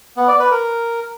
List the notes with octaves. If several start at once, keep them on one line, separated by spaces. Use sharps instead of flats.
B3
D5
B4
A#4